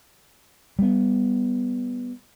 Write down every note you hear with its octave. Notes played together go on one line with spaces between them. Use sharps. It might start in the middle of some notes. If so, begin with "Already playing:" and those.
G3 B3